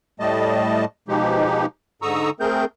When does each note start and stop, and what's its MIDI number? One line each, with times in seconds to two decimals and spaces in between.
0.20 0.85 45
0.20 0.85 55
0.20 0.85 57
0.20 0.85 75
0.20 0.85 81
1.08 1.66 47
1.08 1.66 53
1.08 1.66 56
1.08 1.66 63
1.08 1.66 67
2.02 2.30 44
2.02 2.30 50
2.02 2.30 82
2.02 2.30 85
2.02 2.30 87
2.02 2.30 88
2.40 2.65 57
2.40 2.65 60
2.40 2.65 68
2.40 2.65 70
2.40 2.65 91